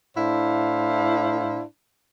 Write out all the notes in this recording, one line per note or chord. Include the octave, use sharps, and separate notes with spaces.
A2 D4 E4 C5 F5